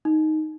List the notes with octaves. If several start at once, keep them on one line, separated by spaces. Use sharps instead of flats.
D#4